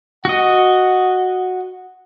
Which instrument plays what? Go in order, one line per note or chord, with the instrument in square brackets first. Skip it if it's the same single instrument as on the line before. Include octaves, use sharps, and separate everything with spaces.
[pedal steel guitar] F#4 D#5 [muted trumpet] F#5